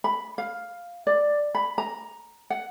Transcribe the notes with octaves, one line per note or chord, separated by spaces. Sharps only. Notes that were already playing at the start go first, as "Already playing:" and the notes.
B5
F5
D5
B5
A#5
F#5